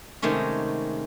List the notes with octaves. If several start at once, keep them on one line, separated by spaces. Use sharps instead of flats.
C3 D#3 G#3 A3 C#4